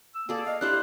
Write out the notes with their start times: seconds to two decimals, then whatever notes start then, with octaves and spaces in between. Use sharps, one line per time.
0.15 E6
0.29 A#3 G#4 A4 D5
0.46 D#5 F5
0.61 D4 E4 G4 C5 F#6